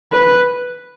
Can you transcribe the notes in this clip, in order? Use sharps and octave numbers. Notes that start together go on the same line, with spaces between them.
B4